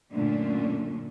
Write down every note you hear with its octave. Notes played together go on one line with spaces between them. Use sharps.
F#2 A#2 D3 A3 C#4 D4